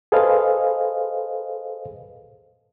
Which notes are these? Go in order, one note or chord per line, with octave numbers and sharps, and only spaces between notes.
G#4 A4 B4 C5 D#5 F5